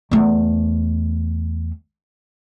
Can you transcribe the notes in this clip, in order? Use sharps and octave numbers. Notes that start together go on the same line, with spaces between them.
E2 A3